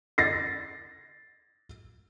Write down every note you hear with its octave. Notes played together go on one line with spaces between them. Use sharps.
A6 A#6 C7